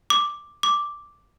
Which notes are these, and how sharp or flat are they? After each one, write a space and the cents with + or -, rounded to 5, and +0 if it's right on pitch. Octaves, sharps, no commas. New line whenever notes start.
D6 +0
D6 -5